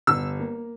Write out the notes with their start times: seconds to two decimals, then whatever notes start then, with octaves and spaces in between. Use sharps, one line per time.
0.07 G1 E6
0.39 A#3